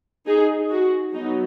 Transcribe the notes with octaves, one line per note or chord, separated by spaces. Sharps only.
D#4 G#4
F#4
F#3 B3 D#4